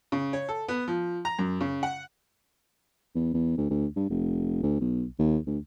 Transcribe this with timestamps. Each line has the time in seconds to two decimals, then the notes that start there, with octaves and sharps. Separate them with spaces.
0.12 C#3
0.33 C#5
0.49 A4
0.68 B3
0.88 F3
1.25 A#5
1.39 F#2
1.61 C#3
1.83 F#5
3.15 E2
3.34 E2
3.57 D2
3.70 D2
3.96 G2
4.10 F1
4.63 D2
4.81 B1
5.19 D#2
5.47 D2